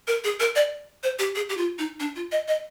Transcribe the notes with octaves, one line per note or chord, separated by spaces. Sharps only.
A#4
G#4
A#4
D5
C5
G4
G#4
G4
F4
D#4
D4
F4
D#5
D#5